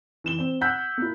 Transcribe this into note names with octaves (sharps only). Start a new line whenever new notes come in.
E3 E7 G7
C4
F#5 E6 F#6 G6 B6
A#3 E4